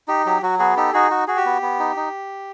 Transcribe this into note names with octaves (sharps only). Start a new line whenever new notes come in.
D#4 G4
F#3 G4
F#3 F#4
B3 F#4 G#4
D#4 G4 A4
D#4 F#4 G#4
F#4
F#4 G#4
G4
B3
B3
D#4
D#4